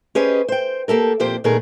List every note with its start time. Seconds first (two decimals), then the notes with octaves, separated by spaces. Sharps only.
0.15 C#4 G4 G#4 B4 C5 D#5
0.48 C5 G5
0.88 A#3 G4 A4 A#4
1.20 F2 A#2 A#3 G4 C5
1.44 A#2 D#3 A3 B3 G#4 A#4